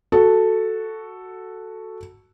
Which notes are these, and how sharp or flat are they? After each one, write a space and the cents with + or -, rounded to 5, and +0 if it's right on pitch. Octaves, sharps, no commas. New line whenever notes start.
F#4 +0 A4 +0